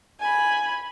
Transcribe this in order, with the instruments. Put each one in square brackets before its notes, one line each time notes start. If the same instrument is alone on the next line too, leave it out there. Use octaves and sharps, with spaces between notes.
[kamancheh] G#5 B5